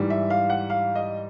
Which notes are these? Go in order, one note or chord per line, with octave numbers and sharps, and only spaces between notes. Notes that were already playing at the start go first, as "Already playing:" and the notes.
Already playing: G#2 E3 G3
E5
F5
F#5
F5
D#5